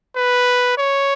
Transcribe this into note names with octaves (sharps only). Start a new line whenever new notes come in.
B4
C#5